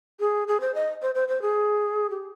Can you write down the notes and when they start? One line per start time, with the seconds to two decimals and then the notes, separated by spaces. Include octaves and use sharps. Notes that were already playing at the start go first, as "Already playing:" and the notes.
0.20 G#4
0.48 G#4
0.60 C5
0.74 D#5
1.02 C5
1.15 C5
1.28 C5
1.42 G#4
2.10 G4